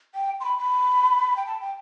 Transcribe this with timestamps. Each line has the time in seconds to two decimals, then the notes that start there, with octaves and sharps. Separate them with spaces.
0.15 G5
0.40 C6
0.44 B5
0.58 B5
1.36 G5
1.46 A5
1.61 G5